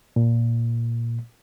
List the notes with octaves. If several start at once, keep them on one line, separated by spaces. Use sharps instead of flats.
A#2